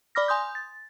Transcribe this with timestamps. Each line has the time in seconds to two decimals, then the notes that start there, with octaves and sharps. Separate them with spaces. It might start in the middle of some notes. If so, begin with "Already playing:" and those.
0.15 D5 B5 D6 F6 A#6
0.28 G#5 C6 D#6 G6
0.55 A6